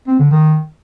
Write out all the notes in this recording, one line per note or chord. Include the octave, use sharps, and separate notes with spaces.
C4
D3
D#3